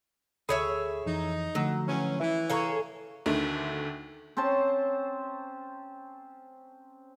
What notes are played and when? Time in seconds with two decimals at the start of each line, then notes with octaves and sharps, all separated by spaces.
0.49 D2 G#4 A4 C#5 E5 B5
1.06 F2 E3 D#4
1.55 D3 F3 F#3 A3
1.87 A2 E3 C#4
2.20 E3 E5
2.50 G#4 A4 C#5 F5 A#5 C#6
3.26 D2 D3 D#3 A3
4.37 C4 C#4 C5 A5